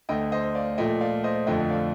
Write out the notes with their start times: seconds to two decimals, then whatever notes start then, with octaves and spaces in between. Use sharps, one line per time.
0.09 D2 D3 A3 D#5 G5
0.32 C5 D#5
0.55 D5 F5
0.78 A#2 F3 A3 D#5 G5
1.01 D5 F5
1.24 C5 D#5
1.47 F2 D3 F3 A3 D#5 G5
1.70 D5 F5